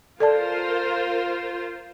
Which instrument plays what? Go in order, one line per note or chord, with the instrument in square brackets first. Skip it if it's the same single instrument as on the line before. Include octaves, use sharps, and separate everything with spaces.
[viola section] F4 A#4 C5 [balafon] A4 D5 A5